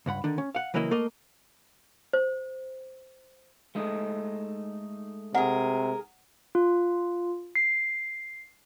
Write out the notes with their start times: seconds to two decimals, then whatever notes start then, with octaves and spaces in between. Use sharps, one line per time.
0.06 C#2 G2 F#5 B5
0.24 D3 D#3 D4
0.38 C#4
0.55 F5 F#5
0.74 C#3 E3 F#3 A#3 E4 D#5
0.91 A3 A#3 A#4 D#5
2.13 C5
3.75 G#3 A3 D#4
5.35 C3 G#4 A#4 F#5
6.55 F4
7.55 C7